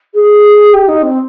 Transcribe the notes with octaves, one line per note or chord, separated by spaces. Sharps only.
G#4
G4
D#4
C4